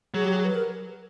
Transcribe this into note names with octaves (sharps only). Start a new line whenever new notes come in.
F#3 G#4
G4
G#4
B4
A#4